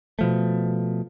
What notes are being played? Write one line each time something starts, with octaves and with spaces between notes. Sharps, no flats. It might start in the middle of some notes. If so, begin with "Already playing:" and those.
B2 F3 A3